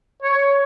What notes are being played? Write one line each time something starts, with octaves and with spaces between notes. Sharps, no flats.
C#5